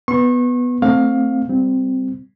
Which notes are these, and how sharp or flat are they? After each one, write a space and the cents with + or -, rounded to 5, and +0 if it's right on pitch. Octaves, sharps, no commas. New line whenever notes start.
B3 +0 C#6 -35
A3 +20 C4 +0 F5 +20
G3 +0 C4 -10